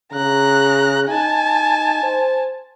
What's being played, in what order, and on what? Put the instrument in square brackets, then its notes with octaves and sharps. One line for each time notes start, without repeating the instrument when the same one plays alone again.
[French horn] C#3 [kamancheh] A#5 F#6
[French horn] D#4 [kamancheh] G#5 A5
[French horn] C5